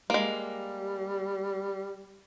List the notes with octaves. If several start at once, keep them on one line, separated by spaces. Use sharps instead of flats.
G3 G#3 A#3